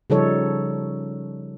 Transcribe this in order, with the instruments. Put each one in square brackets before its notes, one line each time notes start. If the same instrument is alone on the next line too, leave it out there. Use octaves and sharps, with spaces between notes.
[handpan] C#3 F3 G3 D#4 A4 C#5